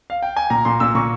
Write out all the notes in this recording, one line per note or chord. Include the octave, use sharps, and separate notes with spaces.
F5
G5
G#5
A#2 A#5
A#2 C6
A#2 E6
A#2 C#6